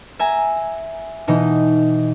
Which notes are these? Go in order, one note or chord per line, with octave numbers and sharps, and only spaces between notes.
E5 G#5 A#5
B2 E3 D#4